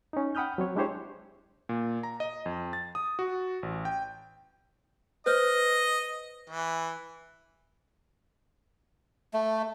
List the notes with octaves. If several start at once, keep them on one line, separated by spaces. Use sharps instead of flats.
C#4 D#4
F#5 G5 B5 D#6 F6 G6
F#3 C4 C#5
G#3 D4 E4 G4 C5 C#5
A#2
A#5
D#5
F2
A6
D#6
F#4
A1
G5
B4 C5 D#5 F6
E3
A3